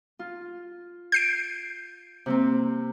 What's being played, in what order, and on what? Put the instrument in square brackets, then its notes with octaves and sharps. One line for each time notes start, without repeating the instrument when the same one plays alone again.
[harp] F4
[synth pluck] G6 C7 D7
[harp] C3 A#3 C4